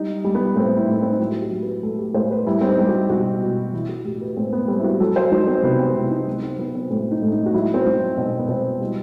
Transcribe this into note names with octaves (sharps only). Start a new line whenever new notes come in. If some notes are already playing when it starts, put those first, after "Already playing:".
Already playing: G3 D#4
G3
B3
A2 C4
E4
A2 D#4
C4
D#4
F#3 E4
F#4
G4
F#3
B4
A2 A4
G4
A2 C5
B4
G3 E4
C4
D#4
G3 G4
F#4
B2 F#4
B2
E3 E4
F#4
A2 G4
B4
A2 C4
B3
G3 C4
E4
F#4
F#3 A4
C5
F#3 D#4
C4
C3 B3
C4
C3 E4
D#4
F#3 B3
D#4
C4
F#3 B3
C4
A2 C4
D#4
A2
D#4
F#4
F#3 E4
C4
F#3 D#4
B2 C4
B3
B2 C4
G3 E4